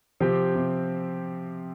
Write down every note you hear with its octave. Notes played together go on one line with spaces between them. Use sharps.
C3 F3 C4 G4
C3